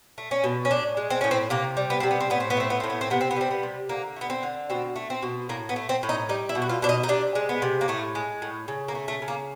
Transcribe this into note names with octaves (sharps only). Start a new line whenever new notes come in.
A3
C#4
B2
C#4
A2 D4
G#3
C4
A2 C#4
C4
C3 A#3
G3
B3
C3 C4
B3
C4
A2 B3
C4
B3
A3 C4
B3
A2 C4
B3
C4
C3 B3
C4
B3
G3 C4
B3
C3
D3 A#3
A3
B3
C4
D3
B2 C4
A3
C4
B2
A2 A#3
B3
A3
C4
A2
D#4
G3 D#4
E4
B2
F#4
F4
B2 D4
D#4
D#4
C3 D4
G#3
B3
C3
A#3
A2 A3
G#3
A2
C#3
A#3
A3
A3
C#3
A#3